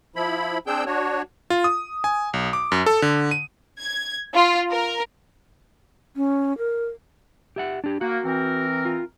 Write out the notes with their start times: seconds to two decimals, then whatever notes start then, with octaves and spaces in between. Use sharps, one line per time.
0.16 F3 E4 B5
0.67 C4 D4 G#4 G5 E6 G6
0.86 D4 F#4 C#5
1.50 F4
1.64 D#6
2.04 G#5
2.33 B1
2.53 D6
2.72 F#2
2.86 A4
3.02 D3
3.31 D#7
3.79 G#6
4.34 F4
4.70 A#4
6.16 C#4
6.58 A#4
7.56 G4 E5 F#5
7.84 D4 G4
8.01 A#3 F#4
8.25 E3 C4 A#4
8.85 F4